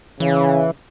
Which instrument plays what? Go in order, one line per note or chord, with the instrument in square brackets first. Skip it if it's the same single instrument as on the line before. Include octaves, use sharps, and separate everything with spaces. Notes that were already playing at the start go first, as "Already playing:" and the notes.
[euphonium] C#3 [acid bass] E3